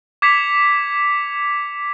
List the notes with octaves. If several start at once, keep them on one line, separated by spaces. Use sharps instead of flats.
D6 G#6 B6 C#7 F7